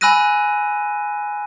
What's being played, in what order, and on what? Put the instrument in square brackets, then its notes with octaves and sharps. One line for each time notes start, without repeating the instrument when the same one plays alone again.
[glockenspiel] G#5 B5 E6 F#6 A#6 D#7